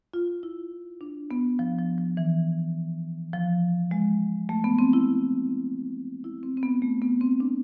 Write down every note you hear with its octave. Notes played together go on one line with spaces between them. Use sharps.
F4
E4
D4
B3
F3
F3
F3
E3
F3
G#3
A3
B3
C4
E4
E4
C4
C4
B3
A3
B3
C4
D4